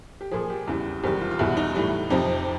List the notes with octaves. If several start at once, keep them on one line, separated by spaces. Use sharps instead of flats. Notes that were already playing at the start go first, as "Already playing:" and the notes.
G4
A#2 F3 G#4
G4
E2 C#3 E3 G3
E2 C3 D#3 G3 G4
F4
F4
E2 B2 G3 E4
D#4
A2 E3 G3
F2 C3 F3 D#4